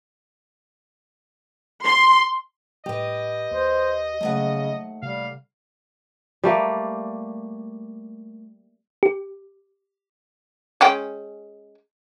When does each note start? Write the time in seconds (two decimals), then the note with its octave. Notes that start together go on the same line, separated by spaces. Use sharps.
1.84 C6
2.86 A2 G3 G4 B4 D#5
3.51 D#2 C5
4.21 D#2 C#3 F#3 G3 A3 F#5
5.02 C3 G3 F5
6.44 G3 A3 A#3
9.03 G4
10.81 G#3 C#4 G5